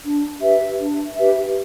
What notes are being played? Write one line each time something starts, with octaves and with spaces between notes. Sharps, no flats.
D4
G4 B4 E5
D4
G4 B4 E5